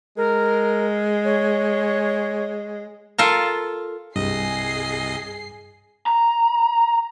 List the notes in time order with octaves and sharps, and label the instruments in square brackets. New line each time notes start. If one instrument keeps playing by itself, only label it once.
[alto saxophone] G#3 [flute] A#4
[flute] C#5
[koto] F4 A4 A#4
[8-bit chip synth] C2 D#5 [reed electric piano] G2 [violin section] G#4 C7
[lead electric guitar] A#5